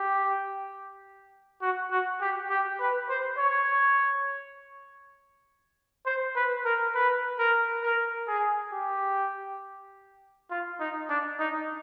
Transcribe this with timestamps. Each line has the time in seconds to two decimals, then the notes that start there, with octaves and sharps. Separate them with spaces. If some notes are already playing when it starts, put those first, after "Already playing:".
Already playing: G4
1.62 F#4
1.91 F#4
2.21 G4
2.50 G4
2.80 B4
3.09 C5
3.39 C#5
6.06 C5
6.35 B4
6.65 A#4
6.95 B4
7.39 A#4
7.83 A#4
8.28 G#4
8.72 G4
10.50 F4
10.80 D#4
11.09 D4
11.39 D#4